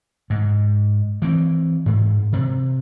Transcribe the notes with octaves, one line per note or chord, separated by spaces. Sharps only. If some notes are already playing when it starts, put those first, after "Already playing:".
G#2
E3 C4
G#2
C3